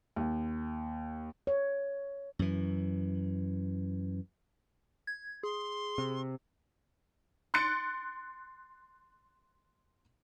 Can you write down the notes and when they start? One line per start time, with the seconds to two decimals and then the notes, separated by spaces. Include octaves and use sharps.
0.16 D#2
1.47 C#5
2.39 F#2 E3
5.07 G#6
5.43 G#4 C6
5.98 C3
7.54 C6 F#6 A6 C#7 D7